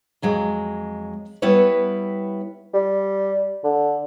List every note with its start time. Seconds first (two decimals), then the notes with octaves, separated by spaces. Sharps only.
0.22 F2 F#3 G#3
1.42 G3 B3 E4 B4 C#5
2.74 G3
3.64 D3